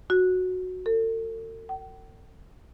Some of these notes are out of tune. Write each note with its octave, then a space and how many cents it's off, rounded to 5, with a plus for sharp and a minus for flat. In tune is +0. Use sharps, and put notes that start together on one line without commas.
F#4 -10
A4 +45
G5 -40